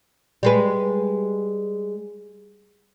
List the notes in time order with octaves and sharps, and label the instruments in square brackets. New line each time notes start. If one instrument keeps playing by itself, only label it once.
[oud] G3 G#3 B4